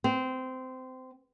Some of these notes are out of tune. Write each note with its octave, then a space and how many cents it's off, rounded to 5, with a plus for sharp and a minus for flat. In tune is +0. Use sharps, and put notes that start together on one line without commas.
C4 -20